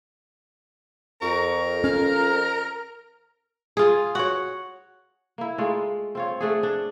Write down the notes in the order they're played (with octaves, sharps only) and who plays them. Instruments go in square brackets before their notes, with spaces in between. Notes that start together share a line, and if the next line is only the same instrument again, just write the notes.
[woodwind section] F2 [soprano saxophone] A#4 [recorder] C#6
[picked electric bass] C#4 [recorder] F6
[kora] F4 G#4
F#4 C#5
A#3 E4
G#3 A3 F4
C4 F4 C#5
A3 D4 G#4
D4